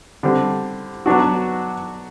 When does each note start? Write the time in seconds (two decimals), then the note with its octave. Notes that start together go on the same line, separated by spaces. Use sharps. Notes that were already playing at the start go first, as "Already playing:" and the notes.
0.23 D3 G3 C4
1.06 F#3 B3 D4 F#4